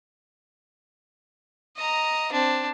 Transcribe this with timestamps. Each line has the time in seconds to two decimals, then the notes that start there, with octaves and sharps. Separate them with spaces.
1.77 D#5 A#5
2.32 C4 D4